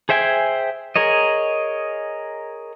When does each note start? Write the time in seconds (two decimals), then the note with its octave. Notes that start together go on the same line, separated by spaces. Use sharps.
0.09 G#4 C5 E5 G5 G#5
0.96 G#4 A#4 C#5 D#5